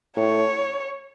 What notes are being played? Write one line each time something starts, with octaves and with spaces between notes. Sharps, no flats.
A2 C#5